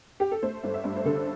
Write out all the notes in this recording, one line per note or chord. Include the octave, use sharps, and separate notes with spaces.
G4
A4
A3 C5
G1
E5
G2
C5
D3 A4